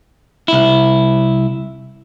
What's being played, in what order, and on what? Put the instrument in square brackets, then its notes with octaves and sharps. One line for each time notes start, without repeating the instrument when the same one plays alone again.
[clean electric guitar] C2 E4